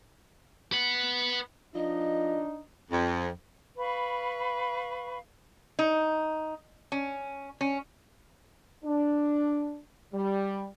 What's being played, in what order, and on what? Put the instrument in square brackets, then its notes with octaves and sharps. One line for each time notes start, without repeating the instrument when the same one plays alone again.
[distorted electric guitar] B4 F#5
[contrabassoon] F3 [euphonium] D4 [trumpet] D#4 [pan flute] D#5
[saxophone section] F2
[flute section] B4 F5 B5 C#6
[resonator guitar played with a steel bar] D#4
C#4
C#4
[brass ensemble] D4
G3